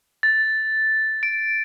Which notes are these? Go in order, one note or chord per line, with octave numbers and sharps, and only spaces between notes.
A6
D7